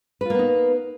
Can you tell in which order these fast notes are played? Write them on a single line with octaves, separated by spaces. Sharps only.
B4 F4 A#3 B3 D#4